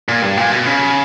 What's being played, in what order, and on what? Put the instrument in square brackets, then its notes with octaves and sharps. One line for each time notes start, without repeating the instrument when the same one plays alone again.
[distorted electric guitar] A#2
G2
A#2
B2
C#3